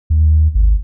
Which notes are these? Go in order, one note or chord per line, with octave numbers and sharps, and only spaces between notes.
D#2
G#1